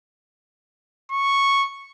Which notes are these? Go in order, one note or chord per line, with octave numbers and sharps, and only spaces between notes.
C#6